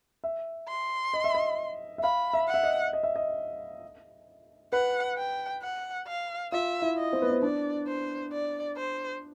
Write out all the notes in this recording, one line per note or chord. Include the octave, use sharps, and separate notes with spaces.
E5
C6
D#5
E5
D#5
E5
F5 B5
E5
F#5
E5
D#5
D#5
E5
D#5
B4 F#5
G5
F#5
F5
F4 E5
E4
D#5
C4
B3
C4
D4 D5
C5
D5
C5